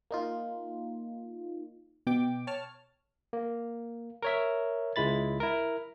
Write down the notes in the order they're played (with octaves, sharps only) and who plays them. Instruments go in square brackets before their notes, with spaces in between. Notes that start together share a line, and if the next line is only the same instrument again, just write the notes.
[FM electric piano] A#3 D#4 F4
B2 G5 D6
C#5 A5 F6
[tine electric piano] A#3
A#4 C#5 E5
C#2 G#3 E4 B5 A6
E4 A#4